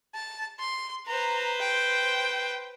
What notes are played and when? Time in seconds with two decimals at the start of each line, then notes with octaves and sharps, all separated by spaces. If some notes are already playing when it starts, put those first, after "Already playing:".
0.14 A5
0.59 C6
1.07 B4 C5 A#5
1.60 G5